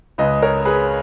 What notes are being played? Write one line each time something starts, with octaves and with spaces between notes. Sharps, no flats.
C#2 C#3 B4 D#5
A#4 C#5
G#4 B4